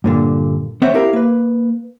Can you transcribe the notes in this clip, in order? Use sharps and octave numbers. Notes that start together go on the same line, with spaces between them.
G2 A#2 D3
B3 C4 C5 C#5 E5 F#5
E4 G4 A#4 E5 F5
A#3 B4